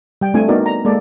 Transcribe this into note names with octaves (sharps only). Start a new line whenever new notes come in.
G3 G5
A3 C4 D4 F4 G#5
B3 D4 D#4 F#4 A#4 D5
A#5
G#3 A#3 A4 D5